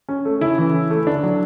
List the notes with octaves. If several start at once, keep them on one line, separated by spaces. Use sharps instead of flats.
C#4
A3
C#3 E4
E3
C#4
A3
D3 D4
F#3